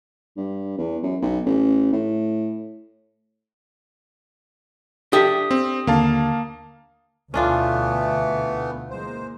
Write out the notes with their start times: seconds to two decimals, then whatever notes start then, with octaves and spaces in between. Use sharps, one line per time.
0.37 G2
0.78 E2
1.03 F#2
1.22 B1
1.45 A1
1.93 A2
5.13 D4 G4 A4 E5 D#6
5.51 C4
5.87 D#2 D3 A#3 F5 A5
7.34 D2 B2 E3 A3 B3 C#4 D4 F4
8.90 E3 G#3 A#3 C5